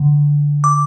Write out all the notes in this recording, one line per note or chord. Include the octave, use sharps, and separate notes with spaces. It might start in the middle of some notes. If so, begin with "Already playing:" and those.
Already playing: D3
D6